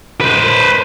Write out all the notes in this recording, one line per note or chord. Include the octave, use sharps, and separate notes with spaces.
B4 C5